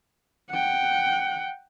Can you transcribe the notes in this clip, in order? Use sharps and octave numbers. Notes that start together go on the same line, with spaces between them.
F#5 G5